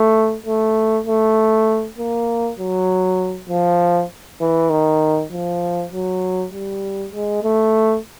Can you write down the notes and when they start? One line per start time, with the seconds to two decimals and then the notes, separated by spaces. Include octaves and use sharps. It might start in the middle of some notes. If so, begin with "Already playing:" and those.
Already playing: A3
0.46 A3
1.07 A3
1.98 A#3
2.59 F#3
3.49 F3
4.41 E3
4.70 D#3
5.32 F3
5.92 F#3
6.53 G3
7.12 G#3
7.43 A3